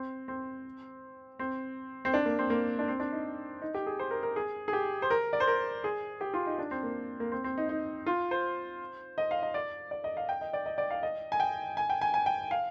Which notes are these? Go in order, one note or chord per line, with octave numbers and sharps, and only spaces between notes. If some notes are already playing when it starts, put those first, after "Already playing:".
Already playing: C4
C4
C4
C4
D4
A#3
C4
A#3
D4
C4
D4
D#4
D#4
G4
G#4
C5
A#4
A#4
G#4
G#4
G4
C5
A#4
D5
C5
A#4
G#4
G4
F4
D#4
D4
C4
A#3
A#3
C4
C4
D#4
D#4
F4
C5
D#5
F5
D#5
D5
D5
D#5
F5
G5
D#5
D5
D#5
D5
F5
D#5
G#5
G5
G#5
G5
G#5
G#5
G5
F5